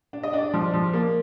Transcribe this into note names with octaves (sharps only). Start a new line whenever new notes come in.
D4
D#5
D4
D5
F3
F3
A#3